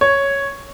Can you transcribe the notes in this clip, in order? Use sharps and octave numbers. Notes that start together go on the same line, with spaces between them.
C#5